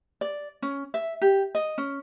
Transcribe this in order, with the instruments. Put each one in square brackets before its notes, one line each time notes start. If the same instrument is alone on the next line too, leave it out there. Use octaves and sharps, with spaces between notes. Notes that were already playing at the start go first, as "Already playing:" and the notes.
[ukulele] D5
C#4
E5
G4
D#5
C#4